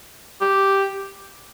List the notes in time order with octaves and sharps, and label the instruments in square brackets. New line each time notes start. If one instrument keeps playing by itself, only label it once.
[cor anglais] G4